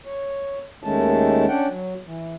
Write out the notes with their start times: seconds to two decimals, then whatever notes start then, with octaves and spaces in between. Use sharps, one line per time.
0.05 C#5
0.84 D#2 D#3 G#3 A3 C#4 A5
1.48 C#4 D4 F#5 G5
1.69 F#3
2.06 E3